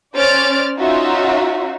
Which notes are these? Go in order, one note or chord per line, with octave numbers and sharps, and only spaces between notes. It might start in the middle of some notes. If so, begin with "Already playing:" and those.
C#4 C5 D5 F6 A6 D7
C#4 D#4 F4 F#4 E5